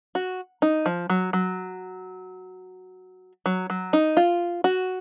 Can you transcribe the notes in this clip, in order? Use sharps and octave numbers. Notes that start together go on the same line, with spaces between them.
F#4
D#4
F3
F#3
F#3
F#3
F#3
D#4
F4
F#4